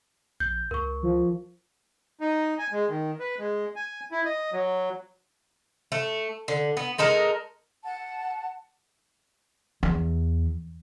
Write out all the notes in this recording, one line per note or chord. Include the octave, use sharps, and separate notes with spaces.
A#1 G6
C#2 A#4 C#6
F3
D#4
G#5
G#3
D#3
B4
G#3
G#5
E4
D#5
F#3
A3
D3
B3
G#3 D#4 A4 A#4
F#5 A5
E2